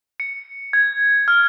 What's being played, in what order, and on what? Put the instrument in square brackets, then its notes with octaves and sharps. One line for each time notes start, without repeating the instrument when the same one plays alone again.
[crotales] C#7
G#6
F6